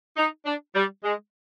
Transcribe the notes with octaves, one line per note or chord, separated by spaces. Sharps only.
D#4
D4
G3
G#3